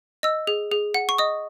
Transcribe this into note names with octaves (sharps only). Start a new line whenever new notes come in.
D#5 E6
G#4
G#4
F#5
C#6
D#5 D#6